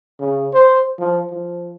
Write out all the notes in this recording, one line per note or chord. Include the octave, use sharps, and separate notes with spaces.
C#3
C5
F3
F3